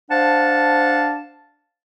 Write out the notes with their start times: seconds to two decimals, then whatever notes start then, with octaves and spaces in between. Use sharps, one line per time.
0.11 D4 C5 F5 F#5 A5